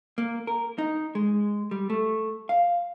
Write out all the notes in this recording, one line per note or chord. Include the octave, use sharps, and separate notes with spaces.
A#3
A#4
D#4
G#3
G3
A3
F5